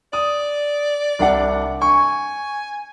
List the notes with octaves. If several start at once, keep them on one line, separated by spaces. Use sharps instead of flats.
D5 D#6
C2 D4 F#5
G#5 C#6